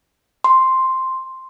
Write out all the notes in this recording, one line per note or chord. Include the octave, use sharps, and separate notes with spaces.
C6